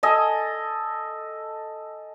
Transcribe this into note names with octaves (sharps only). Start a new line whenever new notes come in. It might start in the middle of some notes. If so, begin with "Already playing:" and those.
A4 D#5 G#5